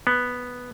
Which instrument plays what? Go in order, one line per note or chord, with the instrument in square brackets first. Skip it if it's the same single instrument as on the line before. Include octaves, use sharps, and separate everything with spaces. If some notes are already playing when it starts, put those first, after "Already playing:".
[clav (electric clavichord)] B3